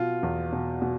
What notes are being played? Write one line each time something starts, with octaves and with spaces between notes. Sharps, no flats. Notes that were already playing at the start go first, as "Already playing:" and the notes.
Already playing: B2 F4
E2
B2
B2